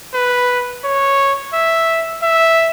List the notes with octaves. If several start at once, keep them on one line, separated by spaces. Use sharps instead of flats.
B4
C#5
E5
E5